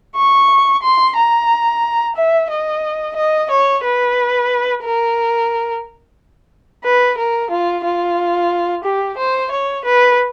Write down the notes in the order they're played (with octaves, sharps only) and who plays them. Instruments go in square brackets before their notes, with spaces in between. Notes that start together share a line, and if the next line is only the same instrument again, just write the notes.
[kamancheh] C#6
C6
A#5
E5
D#5
D#5
C#5
B4
A#4
B4
A#4
F4
F4
G4
C5
C#5
B4